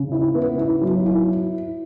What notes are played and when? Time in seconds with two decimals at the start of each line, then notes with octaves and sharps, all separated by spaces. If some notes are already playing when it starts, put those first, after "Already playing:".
Already playing: C#3
0.12 E4
0.35 B3
0.58 E4
0.81 F#3
1.05 E4